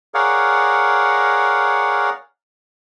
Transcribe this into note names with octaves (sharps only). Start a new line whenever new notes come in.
G#4 A#4 C#5 D5 F5 F#5